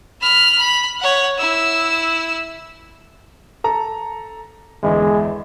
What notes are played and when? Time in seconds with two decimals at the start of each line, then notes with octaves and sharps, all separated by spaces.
0.21 B5 F6
0.59 B5
1.00 C#5 F#5
1.38 E4 E6
3.64 A4 A#5
4.83 G1 E2 G#3